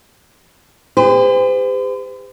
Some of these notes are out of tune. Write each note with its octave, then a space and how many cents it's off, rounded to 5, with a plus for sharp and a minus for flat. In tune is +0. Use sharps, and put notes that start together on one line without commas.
G4 +45 C5 -45